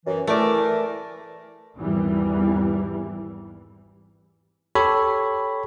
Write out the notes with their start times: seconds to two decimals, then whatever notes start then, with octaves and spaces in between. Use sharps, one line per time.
0.06 F#2 E3
0.27 E3 A3 A4 A#4 D5
1.80 G#1 E2 E3 G3
4.75 G4 A4 C#5 B5